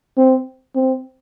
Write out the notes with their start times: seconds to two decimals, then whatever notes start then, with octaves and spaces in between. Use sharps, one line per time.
0.18 C4
0.75 C4